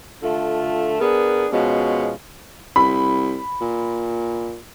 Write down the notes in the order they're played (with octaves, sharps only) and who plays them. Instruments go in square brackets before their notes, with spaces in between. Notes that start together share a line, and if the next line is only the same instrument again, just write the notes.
[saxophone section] D3 A3 F4
B3 D4 G#4 A#4
B2 F3 G#3 C#4
[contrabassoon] C2 [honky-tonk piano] B5
[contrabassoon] A#2